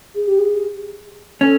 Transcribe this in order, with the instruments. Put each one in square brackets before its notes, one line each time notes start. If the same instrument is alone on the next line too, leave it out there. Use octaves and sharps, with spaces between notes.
[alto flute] G#4
G4
G#4
[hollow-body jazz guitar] C#4 [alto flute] A4